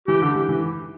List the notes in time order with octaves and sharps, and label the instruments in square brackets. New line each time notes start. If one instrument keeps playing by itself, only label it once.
[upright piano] E3 [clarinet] G4
[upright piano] D3
E3
E3